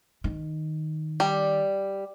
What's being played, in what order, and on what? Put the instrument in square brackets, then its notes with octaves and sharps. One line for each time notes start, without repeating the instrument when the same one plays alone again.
[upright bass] D#3
[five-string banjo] G3